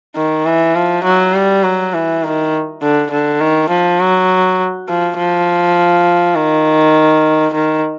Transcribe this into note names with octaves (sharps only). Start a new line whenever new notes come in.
D#3
E3
F3
F#3
G3
F#3
E3
D#3
D3
D3
D#3
F3
F#3
F3
F3
D#3
D#3